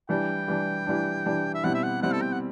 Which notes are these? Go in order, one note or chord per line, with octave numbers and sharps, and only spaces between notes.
E3 G3 D4 G5
E3 G3 D4
E3 G3 D4
E3 G3 D4
E5
B2 G3 C4 E4 F#5
E5
F#5
B2 G3 C4 E4 F#5
A4
G5
F#5